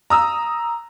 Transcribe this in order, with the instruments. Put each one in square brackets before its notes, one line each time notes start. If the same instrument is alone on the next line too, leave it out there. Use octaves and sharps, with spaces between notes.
[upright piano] A#5 D#6 E6